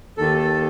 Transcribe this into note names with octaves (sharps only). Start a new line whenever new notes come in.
D#2 D#3 A4
A4